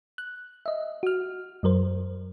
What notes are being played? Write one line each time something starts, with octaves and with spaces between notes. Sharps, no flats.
F#6
D#5 E5
F#4 F6
F#2 F#3 A#4 C5